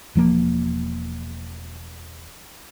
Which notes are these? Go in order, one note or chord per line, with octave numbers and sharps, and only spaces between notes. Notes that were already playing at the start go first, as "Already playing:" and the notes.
E1 F3 A#3